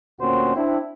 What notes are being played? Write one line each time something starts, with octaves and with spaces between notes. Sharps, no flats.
D2 A#2 C4 C#4 F#4 C5
C4 D4 E4